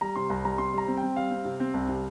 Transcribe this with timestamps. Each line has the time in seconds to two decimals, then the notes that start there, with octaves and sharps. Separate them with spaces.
0.01 G3 A#5
0.15 C3 C6
0.30 C2 A#5
0.45 G3 A#5
0.58 C3 C6
0.74 G3 A#5
0.88 C4
0.97 G5
1.03 C4
1.16 G3 F5
1.31 C4
1.45 C3
1.60 C4
1.74 C2
1.88 C3